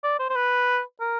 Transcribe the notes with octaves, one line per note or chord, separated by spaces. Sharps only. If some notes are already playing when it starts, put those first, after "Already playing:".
D5
C5
C5
B4
A#4